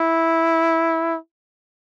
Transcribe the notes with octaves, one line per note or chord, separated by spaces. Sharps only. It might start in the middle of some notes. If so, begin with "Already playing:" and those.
Already playing: E4